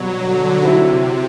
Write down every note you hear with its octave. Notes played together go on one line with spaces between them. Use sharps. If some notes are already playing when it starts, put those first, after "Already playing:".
Already playing: B2 F#3 G3 B3
D3
C3 F#3 C4 E4